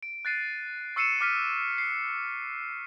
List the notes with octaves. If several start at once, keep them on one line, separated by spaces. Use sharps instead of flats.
D7
F#6 A6 C7 D#7
C#6 E6 C7 C#7 D#7 E7
D6 F6 B6 D#7
C7